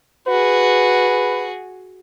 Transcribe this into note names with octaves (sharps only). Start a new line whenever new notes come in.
F#4 G#4 B4